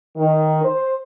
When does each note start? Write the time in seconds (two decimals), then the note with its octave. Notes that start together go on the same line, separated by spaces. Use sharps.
0.17 D#3
0.64 C5